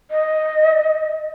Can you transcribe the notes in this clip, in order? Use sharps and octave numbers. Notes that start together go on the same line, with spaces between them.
D#5